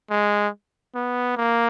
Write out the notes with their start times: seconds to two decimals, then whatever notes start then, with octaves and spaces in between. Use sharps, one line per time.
0.10 G#3
0.95 B3
1.37 A#3